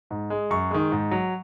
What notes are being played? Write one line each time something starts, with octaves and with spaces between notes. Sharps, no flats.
G#2
G#3
F#2 C#6
D#3 G#3
G#2
F#3